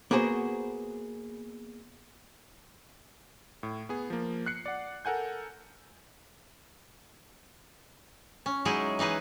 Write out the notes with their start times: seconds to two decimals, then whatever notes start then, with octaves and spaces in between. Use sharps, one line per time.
0.11 A#3 B3 F#4 G#4 C5
3.63 A2
3.89 B3 G#4
4.10 F3 A#3
4.46 F#6 C7 C#7
4.66 D5 F#5
5.05 A4 A#4 F#5 G#5 G6
8.46 C#4
8.65 F#3 G#3 D#4 E4 G#4
8.99 E3 D#4 G#4 B4